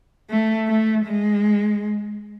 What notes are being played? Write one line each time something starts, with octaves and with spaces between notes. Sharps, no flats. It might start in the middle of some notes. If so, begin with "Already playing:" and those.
A3
A3
G#3